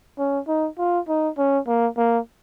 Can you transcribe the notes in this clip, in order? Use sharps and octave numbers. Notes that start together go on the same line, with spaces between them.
C#4
D#4
F4
D#4
C#4
A#3
A#3